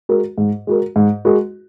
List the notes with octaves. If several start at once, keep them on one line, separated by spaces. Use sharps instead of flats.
G#3 F#4 A#4
G#2
G#3 F#4 A#4
G#2
G#3 F#4 A#4